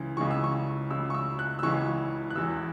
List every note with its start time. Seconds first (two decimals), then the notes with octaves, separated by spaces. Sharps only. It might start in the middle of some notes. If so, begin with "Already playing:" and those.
Already playing: C#2 C#3 E3
0.17 C#2 C#3 E3 C#6
0.31 E6
0.44 C#6
0.90 C#2 C#3 E3 E6
1.10 C#6
1.14 E6
1.39 F#6
1.59 E6
1.63 C#2 C#3 E3 C#6
2.30 F#6
2.36 E1 E2 E3 E6